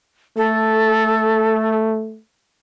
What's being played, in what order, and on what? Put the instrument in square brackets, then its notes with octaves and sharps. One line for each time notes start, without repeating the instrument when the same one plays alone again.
[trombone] A3 [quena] A4